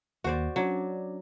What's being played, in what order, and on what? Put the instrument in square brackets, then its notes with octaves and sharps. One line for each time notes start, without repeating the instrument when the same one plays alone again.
[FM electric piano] D#2 A#3 [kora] F#4 C5 D5
[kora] F#3 [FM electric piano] C#4 D4 D5